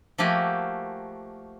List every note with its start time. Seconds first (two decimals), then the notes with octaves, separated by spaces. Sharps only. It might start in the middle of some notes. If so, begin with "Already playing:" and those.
0.18 F3 A3 A#3 F#4 G4 G#5